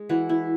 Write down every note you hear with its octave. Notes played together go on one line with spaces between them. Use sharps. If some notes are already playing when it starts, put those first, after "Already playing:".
Already playing: G#3
E3 F#4
E4